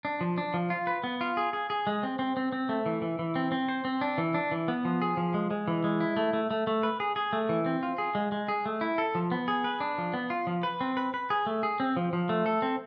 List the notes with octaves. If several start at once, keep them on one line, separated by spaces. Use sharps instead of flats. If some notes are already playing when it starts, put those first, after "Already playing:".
D4
F3
D4
F3
F4
B4
B3
F4
G#4
G#4
G#4
G#3
C4
C4
C4
C4
A3
E3
E3
E3
C4
C4
C5
C4
D4
E3
D4
E3
B3
F3
G#4
F3
G#3
G#3
E3
G#3
E4
A3
A3
A3
A3
B4
G#4
G#4
A3
E3
C4
F4
G#4
G#3
G#3
G#4
A3
E4
A4
F3
B3
G#4
B4
D4
F3
B3
F4
F3
B4
C4
B4
B4
G#4
A3
G#4
C4
F3
F3
A3
A4
C4